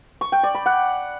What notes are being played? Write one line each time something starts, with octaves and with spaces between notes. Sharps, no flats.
C#6
G5
D5
B5
F#5